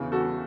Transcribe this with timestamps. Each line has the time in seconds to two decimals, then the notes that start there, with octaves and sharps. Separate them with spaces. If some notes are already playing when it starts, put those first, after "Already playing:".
Already playing: E2 C#3 E3
0.12 F#4 A4